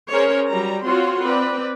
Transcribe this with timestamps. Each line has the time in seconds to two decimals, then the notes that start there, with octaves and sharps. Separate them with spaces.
0.11 C#4 G#4 A#4 C5 C#5
0.48 F#3 G3 A#5
0.86 C4 F4 F#4 C#5 F#5 C6
1.23 C4 B4 D5